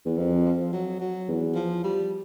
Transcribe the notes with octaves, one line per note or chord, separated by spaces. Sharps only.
E2
F2 F3
F3
F#3
F#3
E2
F3
G3